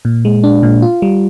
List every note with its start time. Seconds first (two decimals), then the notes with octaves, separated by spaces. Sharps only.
0.05 A#2
0.25 G#3
0.43 D4
0.63 A#2
0.82 F4
1.02 G3